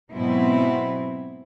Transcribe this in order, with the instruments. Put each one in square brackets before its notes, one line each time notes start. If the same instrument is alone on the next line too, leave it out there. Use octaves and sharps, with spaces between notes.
[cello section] G#2 B2 F#3 B3 C4 E4